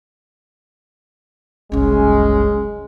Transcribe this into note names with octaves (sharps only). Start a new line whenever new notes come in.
F#1 C2 G#3 C#4